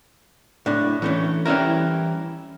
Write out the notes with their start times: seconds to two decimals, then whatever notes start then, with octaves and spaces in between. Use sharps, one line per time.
0.66 A2 D4
1.02 E3 A3 C#4
1.46 E3 G3 C#4 E4 A#4